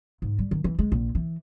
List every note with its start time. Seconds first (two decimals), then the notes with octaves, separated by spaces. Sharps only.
0.22 G#2
0.39 G3
0.51 D#3
0.64 E3
0.79 G#3
0.92 A#1
1.15 E3